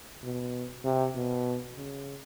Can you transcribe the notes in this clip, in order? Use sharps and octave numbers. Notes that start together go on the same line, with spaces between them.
B2
C3
B2
C#3